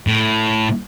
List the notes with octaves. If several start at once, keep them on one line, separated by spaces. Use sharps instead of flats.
A2